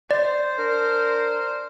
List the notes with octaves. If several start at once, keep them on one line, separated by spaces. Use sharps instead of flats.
C5 D5
D4 A#4